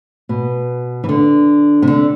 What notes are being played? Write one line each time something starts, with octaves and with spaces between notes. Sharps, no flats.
B2
E3
D3
C3
D3